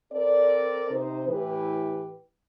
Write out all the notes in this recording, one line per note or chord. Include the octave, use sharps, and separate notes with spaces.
C4 A4 A#4 C5 D5
C3 D#4 C5
A2 E3 G4 B4